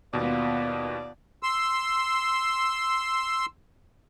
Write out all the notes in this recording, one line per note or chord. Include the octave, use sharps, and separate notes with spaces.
D#2 B2 B3 F4 D5
C6 E6